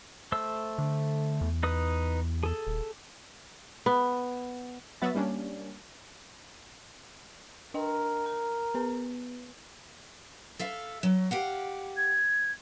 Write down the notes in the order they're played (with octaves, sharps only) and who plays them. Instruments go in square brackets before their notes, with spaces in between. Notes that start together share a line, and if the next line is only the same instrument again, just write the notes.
[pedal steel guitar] A3 C5 E6
[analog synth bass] D3
E2
[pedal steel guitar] D#4 B4 D#6
G#4 A4
[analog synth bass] D#1
[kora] B3
[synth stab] F#3 B3 F#4 E5 B5 A6
G3 A#3 C#4 D4
[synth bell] D4 D#5 G5 [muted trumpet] A#4
[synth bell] A#5
B3 B4
[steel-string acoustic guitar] A4 E5 F5
F#3
G4 F5 F#5
[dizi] G#6